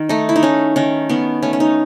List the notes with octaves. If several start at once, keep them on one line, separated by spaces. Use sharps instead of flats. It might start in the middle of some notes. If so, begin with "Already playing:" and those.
Already playing: D#3
A3 D#4
E4
D#4
A3 C#4
D#3 C#4
D#3 B3
A3 C#4
C#4
D#4